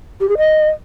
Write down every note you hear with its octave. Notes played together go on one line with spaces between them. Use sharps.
G4
G#4
D#5